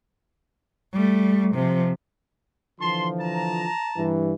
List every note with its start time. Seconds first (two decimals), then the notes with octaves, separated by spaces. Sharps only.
0.93 G3 A3
1.55 C3 F3
2.80 D3 E3 F3 A5 C6
3.19 A5 A#5
3.98 G2 E3